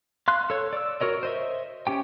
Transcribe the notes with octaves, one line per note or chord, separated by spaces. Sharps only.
F5 C6 F#6
A4 C#5
D5 E6
F#4 A#4 C#5 D#5
C5 D#5 E5
C#4 G4 G5